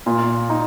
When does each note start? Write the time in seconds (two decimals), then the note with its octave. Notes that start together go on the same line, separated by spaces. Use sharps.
0.06 A#2
0.50 D#4